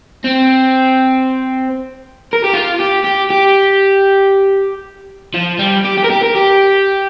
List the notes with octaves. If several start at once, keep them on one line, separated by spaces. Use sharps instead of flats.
C4
A#4
G4
F4
G4
G4
G4
F3
G3
G4
G4
A#4
G4
A#4
G4